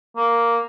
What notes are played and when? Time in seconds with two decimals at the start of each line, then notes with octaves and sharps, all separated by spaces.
0.16 A#3